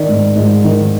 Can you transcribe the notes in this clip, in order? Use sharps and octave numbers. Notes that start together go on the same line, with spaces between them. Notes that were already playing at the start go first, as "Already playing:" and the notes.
Already playing: D#3 D5
G#2
G#2
D#3